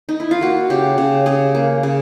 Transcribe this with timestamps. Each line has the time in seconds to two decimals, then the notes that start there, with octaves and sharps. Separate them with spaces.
0.09 D#4
0.20 E4
0.31 F4
0.41 A#3 F#4
0.70 C#3 G4
0.98 C#3
1.26 C#3 G#4
1.55 A#3
1.83 C#3